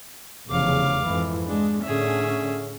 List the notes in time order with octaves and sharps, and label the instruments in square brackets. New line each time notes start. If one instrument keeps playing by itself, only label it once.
[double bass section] F1 E2 C#3 [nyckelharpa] F5 D6
[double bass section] F2 G#2 E3
[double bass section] G#3 [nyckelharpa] D4
[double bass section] A2 D3 C#4 [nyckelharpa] G#4 E5